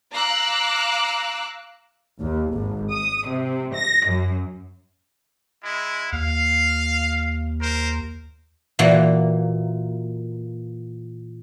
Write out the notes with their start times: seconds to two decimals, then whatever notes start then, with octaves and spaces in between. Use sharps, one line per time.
0.12 F5 A#5 D6 E6 F#6
2.21 D#2
2.54 G#1
2.92 D#6
3.27 C3
3.75 A#6
4.06 F#2
5.62 G#3 E4
6.12 D#2 F5
7.61 A#4 C5
8.79 A#2 E3 A#3 F#4